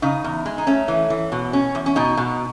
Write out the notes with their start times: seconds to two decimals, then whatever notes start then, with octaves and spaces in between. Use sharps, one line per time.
0.02 C#3 D#4
0.24 E2
0.45 G#3
0.58 D#4
0.67 A3 C#4
0.88 E3
1.10 E3
1.32 B2
1.53 C#4
1.75 E2
1.86 C#4
1.96 B2 D#4
2.17 B2